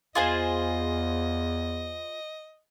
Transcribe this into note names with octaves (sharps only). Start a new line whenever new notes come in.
E2 F4 G#4 C5 D#5